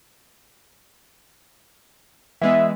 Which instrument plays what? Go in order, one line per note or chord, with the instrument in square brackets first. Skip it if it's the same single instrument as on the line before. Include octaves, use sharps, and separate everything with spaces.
[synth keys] E3 G#3 B3 [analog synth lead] E5